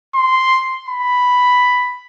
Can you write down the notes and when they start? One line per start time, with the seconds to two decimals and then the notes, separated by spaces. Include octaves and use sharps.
0.15 C6
0.89 B5